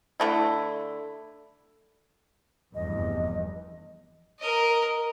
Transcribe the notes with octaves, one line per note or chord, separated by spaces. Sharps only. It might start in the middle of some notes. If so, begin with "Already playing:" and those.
D3 A3 E4
F1 E2 G2 D#5
A#4 D#5